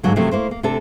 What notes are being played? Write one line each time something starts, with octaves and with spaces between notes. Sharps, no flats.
G#2 D3 F#3 A#3
C3 F3 F#3 A3 A#3
A3 A#3 E4 C5
A#3
C3 A3 D4 A4